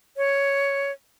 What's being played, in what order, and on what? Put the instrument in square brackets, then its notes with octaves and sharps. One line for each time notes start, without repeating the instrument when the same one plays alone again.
[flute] C#5